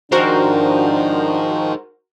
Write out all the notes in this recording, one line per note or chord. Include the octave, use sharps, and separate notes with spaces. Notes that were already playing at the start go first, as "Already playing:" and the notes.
D#3 F3 D4 D#4 F#4 G#4 A#4 C5